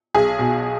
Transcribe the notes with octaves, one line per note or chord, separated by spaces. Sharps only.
B1 G#4
B2